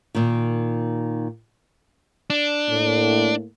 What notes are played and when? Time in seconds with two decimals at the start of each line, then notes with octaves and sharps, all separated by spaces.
0.15 A#2 D#3
2.30 D4
2.69 A2 A#3